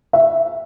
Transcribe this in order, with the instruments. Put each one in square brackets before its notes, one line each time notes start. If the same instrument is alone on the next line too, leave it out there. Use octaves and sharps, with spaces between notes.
[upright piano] E5